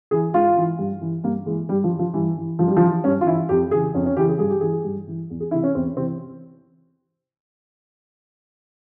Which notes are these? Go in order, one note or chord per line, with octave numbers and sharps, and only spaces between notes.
E3 G#4
G#2 F4
E3
G2
E3
G2 A#3
E3 G#3
G2 G3
F3
E3
F3
G2 E3
E3
G2 F3
G3
F3
E3
G2 C#4
F4
E3 E4
F2 G4
C#3 E3 G#4
F2 C#4
C#4
C#3 E3 G4
G#4
G2 G#4
G4
E3 G#4
G2
E3
E2
G#4
C3 E3 E4
C#4
E2 C4
C3 E3 C4